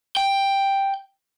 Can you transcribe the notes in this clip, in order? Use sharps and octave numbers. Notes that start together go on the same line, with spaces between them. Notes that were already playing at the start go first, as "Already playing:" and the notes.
G5